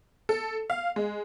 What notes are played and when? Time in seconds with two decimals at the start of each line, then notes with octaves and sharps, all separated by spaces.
0.29 A4
0.70 F5
0.96 G#3